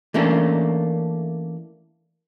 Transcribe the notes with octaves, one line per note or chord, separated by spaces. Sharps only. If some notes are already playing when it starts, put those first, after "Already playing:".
E3 A3 A#3 C#4 D4